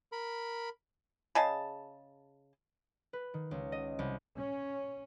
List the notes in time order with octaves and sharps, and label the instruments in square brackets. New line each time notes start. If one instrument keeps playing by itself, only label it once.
[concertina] A#4 B5
[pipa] C#3 G#4 D#5 A5
[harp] B4
D#3
C#2
D#5
C2
[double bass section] C#4